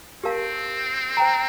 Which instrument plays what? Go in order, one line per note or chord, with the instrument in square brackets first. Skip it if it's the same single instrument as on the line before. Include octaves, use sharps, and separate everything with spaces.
[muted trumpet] C4 [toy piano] G4 A#4 F5 A5
[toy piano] C5 G5 A#5